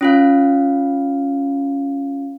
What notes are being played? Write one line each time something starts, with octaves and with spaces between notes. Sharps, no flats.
C#4 F4 F5